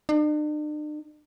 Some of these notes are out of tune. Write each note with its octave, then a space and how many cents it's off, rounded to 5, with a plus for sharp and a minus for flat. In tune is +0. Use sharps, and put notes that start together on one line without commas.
D4 +45